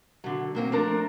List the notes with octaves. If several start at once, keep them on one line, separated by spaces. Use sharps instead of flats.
D3 F#3
F#3 A#3 C4
F3 A3 D4 A#4